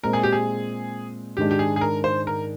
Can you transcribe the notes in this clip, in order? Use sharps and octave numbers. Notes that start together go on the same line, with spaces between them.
A#2 G#3 C4 A#4
G#4
G4
G#4
G#2 D#3 G#3 D4 G4
G4
G#4
G#4
A#4
C5
A#4